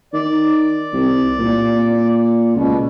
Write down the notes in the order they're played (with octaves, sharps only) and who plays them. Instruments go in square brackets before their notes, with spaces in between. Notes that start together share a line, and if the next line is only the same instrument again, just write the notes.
[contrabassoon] D#3 [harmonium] D5
[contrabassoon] C2
A#2
[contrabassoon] C#2 [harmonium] B2